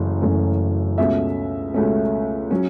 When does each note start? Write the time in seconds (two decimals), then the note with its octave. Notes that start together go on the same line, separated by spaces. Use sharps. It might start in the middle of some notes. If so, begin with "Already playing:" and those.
Already playing: F#1 F#2 E3 A3 C#4
0.22 F#1 F#2 E3 A3 C#4
0.98 C#2 B2 A3 C#4 E5
1.74 C#2 B2 A3 C#4
2.51 F#3 C#4